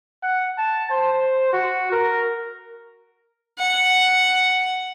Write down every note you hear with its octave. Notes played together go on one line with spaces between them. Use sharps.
F#5
A5
C5
F#4
A#4
F#5